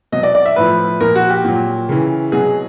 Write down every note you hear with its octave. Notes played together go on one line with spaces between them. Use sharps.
B2 F#3 D#5
D5
D5
E5
A2 F3 B4
A#2 F3 A#4
F#4
G4
A#2 F#3
C#3 E3
B2 F#3 G#4